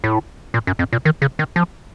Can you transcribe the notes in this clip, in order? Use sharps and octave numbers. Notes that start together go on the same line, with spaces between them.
A2
A#2
F#2
F2
A#2
D#3
C#3
D#3
F3